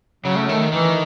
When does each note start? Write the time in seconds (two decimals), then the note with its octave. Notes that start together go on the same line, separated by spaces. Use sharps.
0.25 C#3 F#3
0.36 A3
0.49 D#3 A3
0.72 D#3 E3